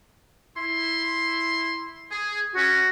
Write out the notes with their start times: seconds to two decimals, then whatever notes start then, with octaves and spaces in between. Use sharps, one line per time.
0.56 E4 C6
2.09 G#4
2.55 C#4 F#4